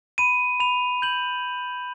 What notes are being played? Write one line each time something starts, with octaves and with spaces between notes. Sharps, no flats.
B5 D#7
B5 F7
G6 F#7